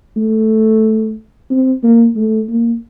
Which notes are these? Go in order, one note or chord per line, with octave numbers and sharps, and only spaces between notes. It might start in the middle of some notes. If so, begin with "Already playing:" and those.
A3
C4
A#3
A3
A#3